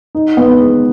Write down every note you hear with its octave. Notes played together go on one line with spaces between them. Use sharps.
D#4
B3
G#3